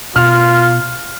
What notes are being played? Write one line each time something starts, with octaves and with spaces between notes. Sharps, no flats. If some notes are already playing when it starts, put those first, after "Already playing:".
B2 F4 F6